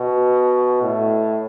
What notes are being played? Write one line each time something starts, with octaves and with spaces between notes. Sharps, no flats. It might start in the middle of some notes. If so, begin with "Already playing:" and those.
Already playing: B2
A2